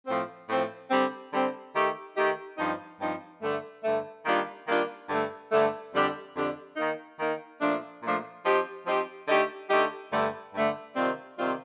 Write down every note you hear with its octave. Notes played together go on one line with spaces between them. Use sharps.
A2 F3 C4
A2 F3 C4
D3 G3 C4
D3 G3 C4
D#3 A3 D#4 G4
D#3 A3 D#4 G4
G2 F3 C4 D#4
G2 F3 C4 D#4
G2 D3 A3
G2 D3 A3
D#3 G3 A#3 D4 F4
D#3 G3 A#3 D4 F4
G2 D3 A3
G2 D3 A3
F2 D3 G3 D4 G4
F2 D3 G3 D4 G4
D#3 A#3 D#4
D#3 A#3 D#4
A#2 F3 A3 D4
A#2 F3 A3 D4
F3 C4 D#4 G4
F3 C4 D#4 G4
D3 A3 D#4 G4
D3 A3 D#4 G4
G2 D3 A3
G2 D3 A3
C3 D#3 G3 C4 F4
C3 D#3 G3 C4 F4